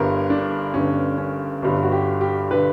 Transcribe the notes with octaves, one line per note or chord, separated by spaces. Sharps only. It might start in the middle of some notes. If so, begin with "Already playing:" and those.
Already playing: G1 G2 D3 A#4
D4
G1 G2 D3 C#4
C#4
G1 G2 D3
F#4
G4
G4
D3 B4